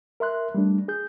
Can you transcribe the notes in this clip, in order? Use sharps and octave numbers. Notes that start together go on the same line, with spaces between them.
A#4 E5 C6 F#6
G3 A3 D4
G#4 G6